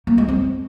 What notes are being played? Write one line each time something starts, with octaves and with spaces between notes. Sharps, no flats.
A#3
G#3
C4